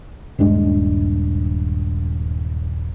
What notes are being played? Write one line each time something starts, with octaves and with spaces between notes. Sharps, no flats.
D#1 G2 G#3 D4